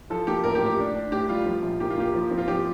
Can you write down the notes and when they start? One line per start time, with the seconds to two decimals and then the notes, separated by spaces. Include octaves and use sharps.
0.10 F3 A4
0.27 A#3 G4
0.44 A1 A#4
0.55 G4
0.61 A2
0.66 G4
0.79 D4
0.95 D4
1.12 A2 G4
1.29 G3 F4
1.46 F3
1.63 A#1
1.80 A#3 G4
1.90 F4
1.97 A#3 G4
2.14 F3
2.31 C4
2.38 F4
2.48 F3 G4